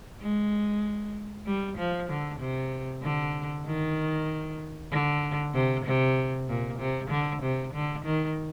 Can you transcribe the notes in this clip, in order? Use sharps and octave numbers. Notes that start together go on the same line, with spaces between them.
G#3
G3
F3
D3
C3
D3
D#3
D3
C3
C3
A#2
C3
D3
C3
D3
D#3